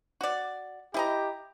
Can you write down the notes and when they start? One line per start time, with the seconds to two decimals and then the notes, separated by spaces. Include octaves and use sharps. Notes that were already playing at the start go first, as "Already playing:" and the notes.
0.21 F#4 D5
0.94 E4 G4 D#5 A#5